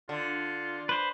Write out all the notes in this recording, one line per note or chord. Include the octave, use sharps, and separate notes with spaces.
D3 F4
B4 C5